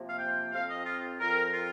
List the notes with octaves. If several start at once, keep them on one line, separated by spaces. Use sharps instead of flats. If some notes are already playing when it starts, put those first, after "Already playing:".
Already playing: C3 F3 A#3
F5
G5
F2 F3 C4 F5
D#5
F4
F2 F3 C4 A#4
F4